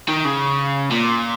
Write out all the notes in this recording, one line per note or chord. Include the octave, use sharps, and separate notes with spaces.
D#3
C#3
A#2